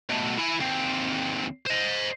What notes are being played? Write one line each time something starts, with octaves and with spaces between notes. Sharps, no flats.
B2 A3
E4 G#5
D#2 C4
C5 D#5